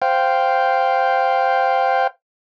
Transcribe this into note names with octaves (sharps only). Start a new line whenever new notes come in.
C5 F5 G5